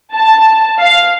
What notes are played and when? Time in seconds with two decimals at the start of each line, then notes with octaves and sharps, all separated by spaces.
0.13 A5
0.80 F5